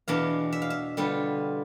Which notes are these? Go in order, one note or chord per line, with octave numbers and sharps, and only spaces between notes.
E2 B2 B3 D4 F5
E5
F5
E5
D3 G3 B3 F4